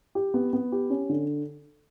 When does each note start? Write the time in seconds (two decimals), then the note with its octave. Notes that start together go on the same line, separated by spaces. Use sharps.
0.15 G4
0.34 B3
0.53 B3
0.72 G4
0.90 C#4
1.09 D3